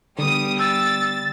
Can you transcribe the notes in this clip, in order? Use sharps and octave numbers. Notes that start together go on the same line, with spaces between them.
D3 G3 B3 D#6
E6 A6